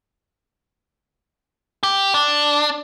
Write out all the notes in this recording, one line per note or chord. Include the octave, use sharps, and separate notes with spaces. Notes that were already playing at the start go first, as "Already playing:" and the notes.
G4
D4